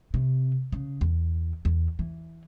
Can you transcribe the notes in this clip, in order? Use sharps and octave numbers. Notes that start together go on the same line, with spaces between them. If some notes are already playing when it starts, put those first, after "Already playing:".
C3
C#3
E2
E2
E3